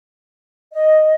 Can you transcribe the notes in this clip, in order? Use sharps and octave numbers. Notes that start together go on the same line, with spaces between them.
D#5